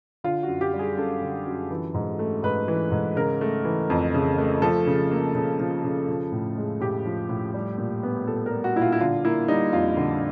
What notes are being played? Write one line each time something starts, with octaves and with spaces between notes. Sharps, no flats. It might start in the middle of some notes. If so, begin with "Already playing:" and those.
D3 F4
F#2 F#4
G4
G3
G#4
F#2 A4
D3
F#2
E3
G#2
A3
G#2 B4
E3
G#2
C#3 A#4
A3
E3
F2
C#3
A3
F3 A4
C#3
A#3
C#3
F3
C#3
F3
A2
G#3
A2 G4
F3
A2
G3
A#2
B3
A#2 A4
G3 A#4
F#4
A#2 E4
F4
E4
D3 F4
A#3 E4
G3 D#4
F2 F4
D3